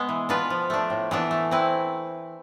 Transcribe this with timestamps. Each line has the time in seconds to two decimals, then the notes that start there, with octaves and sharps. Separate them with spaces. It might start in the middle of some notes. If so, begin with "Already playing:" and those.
Already playing: B2 G#3 B3
0.09 E3
0.29 B3 D4 F4 B4
0.50 F3
0.70 A3 D4
0.90 A2
1.11 E3 B3 D4
1.31 A3
1.51 C4 E4 B4